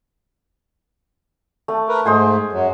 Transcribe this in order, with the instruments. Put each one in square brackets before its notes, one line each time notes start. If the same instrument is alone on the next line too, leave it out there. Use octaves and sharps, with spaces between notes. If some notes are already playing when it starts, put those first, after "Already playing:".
[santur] A3 A5
[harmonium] A#4 B4
[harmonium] G#2 A3 [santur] G#3 C5 G#5
[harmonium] F#2 F#3